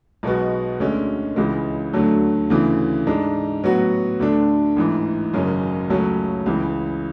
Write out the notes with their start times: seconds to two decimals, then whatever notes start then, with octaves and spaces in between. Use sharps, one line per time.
0.23 B1 B2 G#3 B3 F#4
0.80 D2 D3 G#3 C#4
1.36 C#2 C#3 E3 G#3
1.93 D2 D3 F#3 A3
2.50 D2 C#3 E3
3.07 G#2 G#3 D4
3.64 A2 F#3 B3 F#4
4.20 D2 D3 A3 D4
4.76 A1 G#2 E3
5.34 G#1 F#2 C#3 G#3 C#4
5.90 C#2 C#3 F#3 A3 C#4
6.46 C#2 C#3 E3